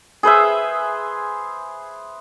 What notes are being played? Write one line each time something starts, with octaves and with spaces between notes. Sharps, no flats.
G#4 B4 C5 E5